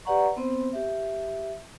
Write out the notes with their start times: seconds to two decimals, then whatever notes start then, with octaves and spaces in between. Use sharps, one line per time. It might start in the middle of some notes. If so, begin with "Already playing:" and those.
0.05 G4 B4 D5 F#5 A#5 C#6
0.37 B3 C4 C5
0.73 G4 E5